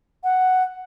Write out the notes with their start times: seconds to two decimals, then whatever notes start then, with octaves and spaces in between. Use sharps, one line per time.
0.24 F#5